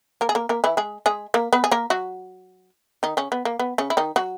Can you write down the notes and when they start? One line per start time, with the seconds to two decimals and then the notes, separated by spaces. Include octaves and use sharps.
0.21 A#3 A#4
0.29 G#4
0.35 A#3 A#4
0.49 A#3 A#4
0.64 E3 E4
0.77 G#3 G#4
1.06 G#3 G#4
1.34 A#3 A#4
1.53 B3 B4
1.64 G#4
1.71 A#3 A#4
1.90 F#3 F#4
3.03 D#3 D#4
3.17 C#3 C#4
3.32 B3
3.45 A#3
3.59 B3
3.78 C#3 C#4
3.90 E4
3.97 D#3 D#4
4.16 F#3 F#4